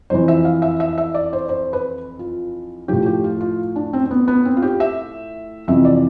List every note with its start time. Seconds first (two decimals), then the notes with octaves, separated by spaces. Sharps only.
0.10 F2 E3 C5
0.28 E5
0.45 F5
0.62 E5
0.80 E5
0.98 E5
1.14 D5
1.33 C5
1.49 C5
1.73 B4
2.19 F4
2.88 A2 F3 G4
3.06 G4
3.24 F4
3.41 F4
3.76 D4
3.93 C4
4.05 C4
4.11 B3
4.28 B3
4.45 C4
4.57 F4
4.62 G4
4.80 E5
5.68 F2 C3 E3 E5
5.85 D5